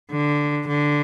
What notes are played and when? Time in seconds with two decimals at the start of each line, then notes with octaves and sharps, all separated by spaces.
0.11 D3
0.67 D3